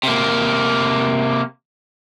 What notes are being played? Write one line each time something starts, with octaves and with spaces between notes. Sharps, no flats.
C3 A#3